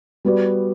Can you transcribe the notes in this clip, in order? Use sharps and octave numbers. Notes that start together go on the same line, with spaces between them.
G3 B3 F#4 B4 D5